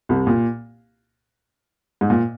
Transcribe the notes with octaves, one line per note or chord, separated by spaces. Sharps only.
C2 C3
A#2
G#2
A#2